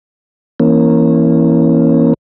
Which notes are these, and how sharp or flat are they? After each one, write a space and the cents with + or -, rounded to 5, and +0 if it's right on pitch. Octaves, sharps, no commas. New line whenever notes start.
E3 +0 A#3 +0 C#4 -25